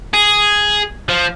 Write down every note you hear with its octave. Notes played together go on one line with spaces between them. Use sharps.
G#4
F3